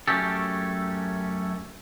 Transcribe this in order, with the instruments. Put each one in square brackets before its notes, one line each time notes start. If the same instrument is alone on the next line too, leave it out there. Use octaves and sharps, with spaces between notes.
[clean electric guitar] F#2 A3 C#4 G4 A4